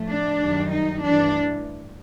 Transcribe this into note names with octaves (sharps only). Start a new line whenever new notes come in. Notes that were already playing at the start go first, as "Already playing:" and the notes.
Already playing: A2 F3 A3
D4
F#2 D#3 G3
D#4
G2 E3 A3 D4